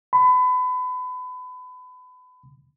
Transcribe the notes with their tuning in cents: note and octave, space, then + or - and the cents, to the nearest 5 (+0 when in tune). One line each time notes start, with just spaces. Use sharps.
B5 +30